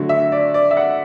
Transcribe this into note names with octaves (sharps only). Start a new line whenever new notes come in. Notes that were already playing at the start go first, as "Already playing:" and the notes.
Already playing: D3 F#3 A3
E5
D5
D5
E5
F#5